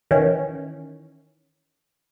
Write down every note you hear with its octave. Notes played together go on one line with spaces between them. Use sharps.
D#3 E3 C#4